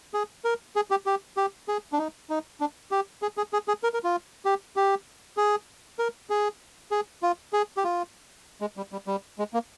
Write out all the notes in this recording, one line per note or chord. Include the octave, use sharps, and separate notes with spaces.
G#4
A#4
G#4
G4
G4
G4
G#4
D4
D#4
D#4
D4
G4
G#4
G#4
G#4
G#4
A#4
A#4
F4
G4
G4
G#4
A#4
G#4
G#4
F4
G#4
G4
F4
G#3
G3
G3
G3
G#3
A#3